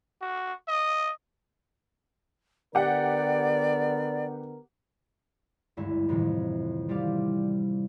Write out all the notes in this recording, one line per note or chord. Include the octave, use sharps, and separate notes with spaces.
F#4
D#5
D3 B3 G4 A#4 D5 F#5
G#1 D2 G2 E4
F2 A2 C3 D#3 E3
G3 C4 E4 G4 D5 F5